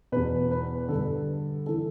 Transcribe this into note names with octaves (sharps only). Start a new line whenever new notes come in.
E2 B2 B4
B4
G2 D3 A4
E3 A4